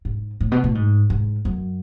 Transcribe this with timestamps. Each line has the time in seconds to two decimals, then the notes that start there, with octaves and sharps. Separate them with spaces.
0.05 G#2
0.40 A2
0.52 B2
0.64 A2
0.75 G#2
1.10 G#2
1.45 F#2